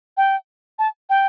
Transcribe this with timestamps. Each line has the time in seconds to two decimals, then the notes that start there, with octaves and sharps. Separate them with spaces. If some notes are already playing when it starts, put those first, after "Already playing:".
0.17 G5
0.79 A5
1.09 G5